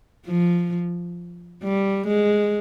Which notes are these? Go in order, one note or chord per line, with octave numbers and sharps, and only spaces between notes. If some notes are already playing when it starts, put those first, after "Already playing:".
F3
G3
G#3